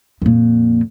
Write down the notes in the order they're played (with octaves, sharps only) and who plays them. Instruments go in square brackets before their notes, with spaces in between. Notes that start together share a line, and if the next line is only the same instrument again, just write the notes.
[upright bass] F2 A#2